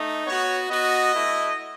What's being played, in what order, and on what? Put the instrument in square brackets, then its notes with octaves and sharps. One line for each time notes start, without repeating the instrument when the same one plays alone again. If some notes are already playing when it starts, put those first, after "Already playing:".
Already playing: [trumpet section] A3 D#4
B3 F#4 C#5
B3 F#4 D#5
A3 E4